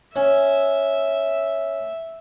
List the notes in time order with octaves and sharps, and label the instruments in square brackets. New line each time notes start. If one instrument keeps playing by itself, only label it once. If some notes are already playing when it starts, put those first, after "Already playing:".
[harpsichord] C#4 [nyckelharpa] E5